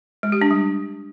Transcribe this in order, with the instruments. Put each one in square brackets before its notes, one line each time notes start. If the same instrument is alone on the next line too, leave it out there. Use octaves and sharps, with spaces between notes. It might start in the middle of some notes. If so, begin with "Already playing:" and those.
[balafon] G#3
G4
D4
G3